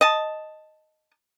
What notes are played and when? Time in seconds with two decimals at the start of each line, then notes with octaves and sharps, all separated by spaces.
0.01 D#5 A5